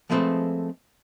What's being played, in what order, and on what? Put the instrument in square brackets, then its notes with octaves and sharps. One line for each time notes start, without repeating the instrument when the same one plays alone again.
[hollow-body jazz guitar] F3 G#3 A3 C4 B4 C5